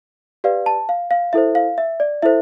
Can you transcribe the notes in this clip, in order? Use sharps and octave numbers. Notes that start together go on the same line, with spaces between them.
G4 B4 D5 F5
A5
F5
F5
E4 A4 C5 E5
F5
E5
D5
E4 A4 C5 E5